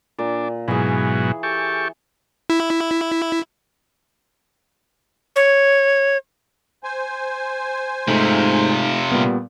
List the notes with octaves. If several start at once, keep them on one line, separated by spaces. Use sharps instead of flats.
A#2 D4
G#2 B2 E3 F#3 G#4
G4 A4 C#6
E4
C#5
C5 G#5
G#2 C3 F3 A3 D#4
A#2 G3 B3